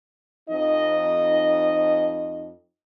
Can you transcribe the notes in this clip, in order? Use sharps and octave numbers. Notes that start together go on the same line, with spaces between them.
F2 D#4 D#5